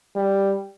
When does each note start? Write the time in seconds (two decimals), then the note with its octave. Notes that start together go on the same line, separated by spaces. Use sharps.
0.16 G3